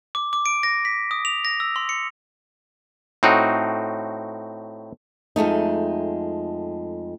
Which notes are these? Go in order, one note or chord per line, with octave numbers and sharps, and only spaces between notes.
D6
D6
D7
A#6
B6
D#6
F7
A#6
E6
C6
C#7
A2 C4 D#4 F#4
F2 G#3 A3 D#4